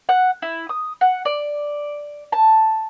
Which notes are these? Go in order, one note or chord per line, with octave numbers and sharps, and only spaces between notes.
F#5
E4
D#6
F#5
D5
A5